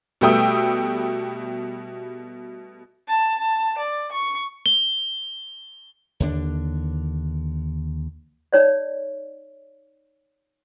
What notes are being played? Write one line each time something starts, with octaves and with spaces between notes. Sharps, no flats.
B2 G3 A3 G5 D#6 E6
A5
A5
D5
C#6
G7
D#2 D3 D4
D#4 C#5 D5